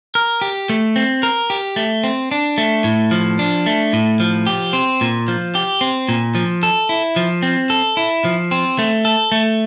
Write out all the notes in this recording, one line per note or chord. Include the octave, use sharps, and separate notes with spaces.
A#4
G4
A3
C4
A#4
G4
A3
C4
D4
A3
A2
F3
D4
A3
A2
F3
G4
C4
A#2
F3
G4
C4
A#2
F3
A4
E4
F3
C4
A4
E4
F3
C4
A3
A4
A3